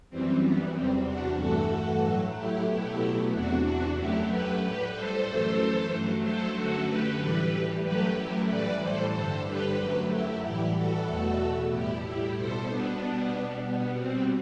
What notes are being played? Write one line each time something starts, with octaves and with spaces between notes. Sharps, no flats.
F#2 E3 G3 C4
B3
E2 C3 G3 C4
D4 F#4
G2 E3 A3 F#4 A4
A2 F#3 A3
E4 G4
B2 F#3 A3 E4 G4
E2 C3 E3 D4 F#4
D4 F#4
F#2 F#3 A3 E4 G4
G4 B4
A2 G3 G4 B4
A4 C5
F#2 E3 A3
G2 F#3 A3
A4 C5
F#2 D3 A3 F#4 A4
G4 B4
A2 E3 G3
F#2 F#3 A3 G4 B4
E4 G4
A2 E3 G3 B4 D5
A4 C5
G2 D3 G3 A4 C5
G4 B4
F#2 F#3 A3
E4 G4
A2 E3 G3 E4 G4
F#4 A4
E2 B2 A3
A2 G3 E4 G4
E4 G4
B2 G3 A4 C5
B3 D4
B2 G3
B2 G3 B3
C4